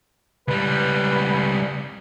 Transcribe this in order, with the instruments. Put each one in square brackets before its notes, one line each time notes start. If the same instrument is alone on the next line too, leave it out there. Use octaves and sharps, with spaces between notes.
[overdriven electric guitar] C#2 G3 [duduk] B4